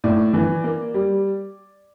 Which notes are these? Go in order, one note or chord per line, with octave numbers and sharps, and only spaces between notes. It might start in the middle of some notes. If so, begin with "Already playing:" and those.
A2 D5
E3
A#3
G3